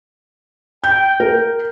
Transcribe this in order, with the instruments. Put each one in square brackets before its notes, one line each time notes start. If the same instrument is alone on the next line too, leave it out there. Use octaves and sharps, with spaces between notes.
[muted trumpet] G5 [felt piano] G6
[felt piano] A#4